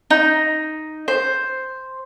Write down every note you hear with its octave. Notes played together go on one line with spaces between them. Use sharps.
D#4
C5